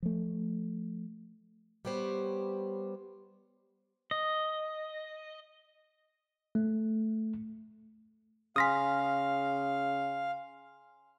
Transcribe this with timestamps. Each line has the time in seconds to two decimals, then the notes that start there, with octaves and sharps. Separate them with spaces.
0.03 F3 A3
1.85 G3 B3 G4 C5 C#5
4.11 D#5
6.55 A3
8.56 C#3 F5 G#5 C6 D#6 F6 A#6 B6